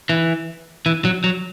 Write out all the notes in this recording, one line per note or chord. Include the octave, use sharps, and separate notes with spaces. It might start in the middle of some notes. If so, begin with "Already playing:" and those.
E3
E3
F#3
F#3